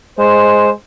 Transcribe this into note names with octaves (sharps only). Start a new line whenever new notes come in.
G#3 C5